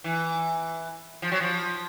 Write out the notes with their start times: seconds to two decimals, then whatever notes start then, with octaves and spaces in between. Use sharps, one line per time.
0.04 E3
1.22 F3
1.32 F#3
1.41 F3